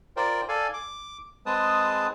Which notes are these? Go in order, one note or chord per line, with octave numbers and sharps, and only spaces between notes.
F4 A#4 C5 D5 G5
A4 D5 F5 G#5
D6
G#3 C4 G#4 B4 A5 D#6